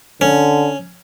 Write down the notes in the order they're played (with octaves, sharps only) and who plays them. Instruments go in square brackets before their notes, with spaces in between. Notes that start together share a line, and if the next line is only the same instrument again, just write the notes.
[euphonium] D3 [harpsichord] C#4